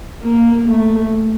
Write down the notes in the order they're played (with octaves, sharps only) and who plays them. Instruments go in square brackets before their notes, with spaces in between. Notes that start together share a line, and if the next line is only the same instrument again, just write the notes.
[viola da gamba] A#3
A3